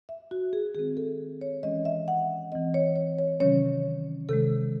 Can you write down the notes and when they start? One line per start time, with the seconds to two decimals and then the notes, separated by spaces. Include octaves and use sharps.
0.09 E5
0.31 F#4
0.53 G#4
0.75 D#3 G#3 C4 G#4
0.97 A4
1.41 C#5
1.63 E3 G#3 C#4 D#5
1.85 E5
2.08 F#5
2.52 E3 C4 D#5
2.74 C#5
2.96 C#5
3.19 C#5
3.40 C3 D#3 F#3 C#4 C#5
4.29 C3 D#3 G#3 A4